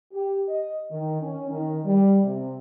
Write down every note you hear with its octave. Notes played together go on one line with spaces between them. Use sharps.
G4
D#5
D#3
C#4
D#3
G3
C3